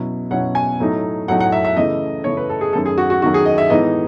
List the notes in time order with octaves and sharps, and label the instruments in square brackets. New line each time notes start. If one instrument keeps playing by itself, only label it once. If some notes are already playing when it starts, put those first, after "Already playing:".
Already playing: [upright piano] B2 F#3 C#4 E4
B2 F#3 C#4 E4 F#5
G#5
A2 F#3 A3 D#4
A2 F#3 A3 D#4 F#5
F#5
E5
E5
C#3 E3 A3 E4 D#5
C#3 E3 A3 E4 C#5
B4
A4
G#4
F#2 D#3 A3 A4
G#4
F#4
F#4
F#2 D#3 A3 F#4
G#4
D#5
E5
A2 E3 G#3 B3 D#4 D#5